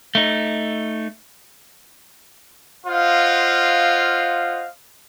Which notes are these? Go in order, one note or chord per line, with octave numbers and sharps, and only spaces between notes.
A3 D#4
F4 C5 D#5 F5 F#5